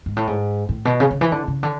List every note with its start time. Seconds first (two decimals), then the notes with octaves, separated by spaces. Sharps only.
0.06 G#2
0.17 A2
0.27 G#2
0.69 A2
0.85 B2
1.00 C#3
1.11 C#3
1.21 E3
1.32 D3
1.48 C#3
1.63 D3